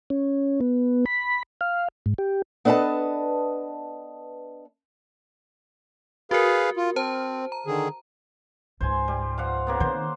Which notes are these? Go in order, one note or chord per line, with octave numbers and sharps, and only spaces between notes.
C#4
B3
B5
F5
G#2
G4
B3 D4 A4 B4 D#5 A5
F#4 G#4 A#4 B4 F5
F4
C4 C5 A5
A#5
D3 D#3 G#4
C#2 G#2 C5 G#5
G3
F3 F5 F#5
C#3 A#3 B3
D#3 C4 C5